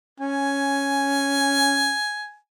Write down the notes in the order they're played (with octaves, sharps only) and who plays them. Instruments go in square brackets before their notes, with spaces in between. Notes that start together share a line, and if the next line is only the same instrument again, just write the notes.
[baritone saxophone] C#4 [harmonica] G#5